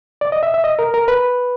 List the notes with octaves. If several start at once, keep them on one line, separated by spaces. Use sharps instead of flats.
D5
D#5
E5
E5
D#5
A#4
A#4
B4